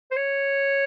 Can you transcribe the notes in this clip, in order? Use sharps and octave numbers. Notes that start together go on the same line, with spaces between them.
C5
C#5